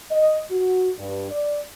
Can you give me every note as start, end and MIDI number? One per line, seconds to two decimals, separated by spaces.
0.11 0.41 75
0.51 0.90 66
0.98 1.30 43
1.31 1.61 74